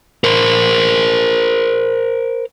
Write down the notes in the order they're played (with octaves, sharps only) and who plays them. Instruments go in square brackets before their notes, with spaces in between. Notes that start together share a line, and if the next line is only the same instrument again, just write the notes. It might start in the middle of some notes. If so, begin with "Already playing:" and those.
[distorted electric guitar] A#4 C5